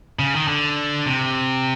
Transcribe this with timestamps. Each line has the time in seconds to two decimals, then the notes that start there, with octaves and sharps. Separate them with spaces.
0.19 C#3
0.34 D#3
0.48 D3
1.06 C3